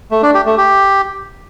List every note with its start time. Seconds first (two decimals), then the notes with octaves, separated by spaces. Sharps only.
0.11 A3
0.23 D4
0.34 G4
0.46 A3
0.57 G4